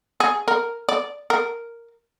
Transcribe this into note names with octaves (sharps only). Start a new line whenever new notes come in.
G#4
A#4
D5
A#4